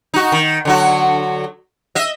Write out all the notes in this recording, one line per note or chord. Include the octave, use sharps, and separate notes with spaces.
D#4 F#4
D#3
D3 F#3 F#4
D#5 E5